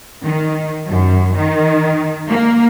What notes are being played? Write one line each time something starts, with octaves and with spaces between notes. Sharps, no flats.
D#3
F#2
D#3
A#3